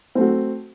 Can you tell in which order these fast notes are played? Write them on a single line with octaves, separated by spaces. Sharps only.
C4 A3 F#4